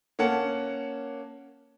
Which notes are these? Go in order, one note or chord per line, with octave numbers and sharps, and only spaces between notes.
A#3 C#4 F#5 A5